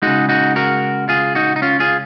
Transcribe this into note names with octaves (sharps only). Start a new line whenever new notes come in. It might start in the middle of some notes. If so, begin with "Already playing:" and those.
C#3 G#3 D#4 F#4
D#4 F#4
F#4 A#4
F4 G#4
D#4 F#4
D#4
C#4 F4
F4 G#4